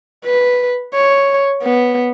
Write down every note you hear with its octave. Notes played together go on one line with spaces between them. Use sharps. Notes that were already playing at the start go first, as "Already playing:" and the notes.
B4
C#5
B3